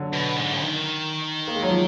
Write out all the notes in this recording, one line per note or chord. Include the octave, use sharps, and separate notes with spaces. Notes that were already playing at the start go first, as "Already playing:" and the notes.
Already playing: D3 F#3
B2
G#2
D#3
A#3
G#3
F#3
F3